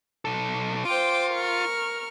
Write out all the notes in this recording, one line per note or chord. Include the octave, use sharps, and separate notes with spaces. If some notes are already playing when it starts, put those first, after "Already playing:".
B1 A4
F4 C5 G5 D6
A#4 C#6 F6